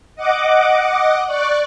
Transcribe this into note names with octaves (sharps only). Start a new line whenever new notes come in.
D#5 F#5 D6
D5 C#6 F#6